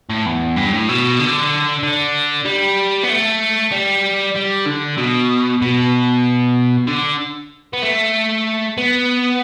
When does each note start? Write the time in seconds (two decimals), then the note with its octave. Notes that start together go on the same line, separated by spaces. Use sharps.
0.09 A2
0.26 E2
0.56 G2
0.72 A2
0.89 B2
1.20 D3
1.83 D3
2.45 G3
3.03 B3
3.10 A3
3.72 G3
4.36 G3
4.66 D3
4.98 B2
5.62 B2
6.88 D3
7.73 B3
7.82 A3
8.78 B3